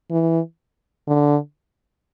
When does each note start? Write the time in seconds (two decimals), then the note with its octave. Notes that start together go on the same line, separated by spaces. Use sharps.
0.11 E3
1.07 D3